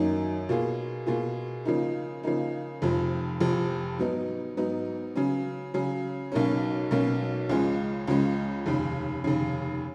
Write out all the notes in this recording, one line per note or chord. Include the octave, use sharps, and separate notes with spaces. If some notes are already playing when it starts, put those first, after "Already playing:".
Already playing: F#2 D#3 F#3 A#3 D#4
B2 A#3 F4 G#4
B2 A#3 F4 G#4
C#3 F3 A#3 D#4
C#3 F3 A#3 D#4
F1 F2 F3
F1 F2 F3
G#2 F#3 B3 D#4
G#2 F#3 B3 D#4
C#3 F#3 C#4
C#3 F#3 C#4
B1 B2 F#3 A#3 C#4
B1 B2 F#3 A#3 C#4
C#2 C#3 F3 G#3 C#4
C#2 C#3 F3 G#3 C#4
F1 D#2 C#3
F1 D#2 C#3